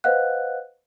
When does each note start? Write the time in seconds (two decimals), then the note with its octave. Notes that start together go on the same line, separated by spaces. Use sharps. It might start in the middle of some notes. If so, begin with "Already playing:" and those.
0.04 B4 C5 D#5 F5 F#5 F#6